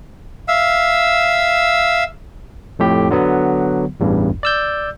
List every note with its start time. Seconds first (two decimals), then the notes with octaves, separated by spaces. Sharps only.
0.48 E5 F5 E6
2.79 F2 A2 G4
3.10 D3 F#3 B3
4.00 A1 E2 G2
4.43 D5 E6 G6